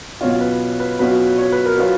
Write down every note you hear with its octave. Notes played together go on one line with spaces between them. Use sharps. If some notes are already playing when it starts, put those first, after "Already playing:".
B2 F#3 C#4 F4 C#5
B4
B4
B2 F#3 C#4 F4 B4
C#5
B4
A#4
F#3 C#4 F4 B4